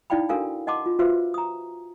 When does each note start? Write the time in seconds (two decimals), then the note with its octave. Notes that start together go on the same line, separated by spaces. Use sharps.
0.10 D#4 E4 D5 F5 G5 B5
0.29 D4 F#4 A4 A#4 F5 G#5
0.67 D#5 F#5 A5 C6 D6
0.86 F4
0.99 F4 F#4 B4 C5 E5 F5
1.34 A#5 D#6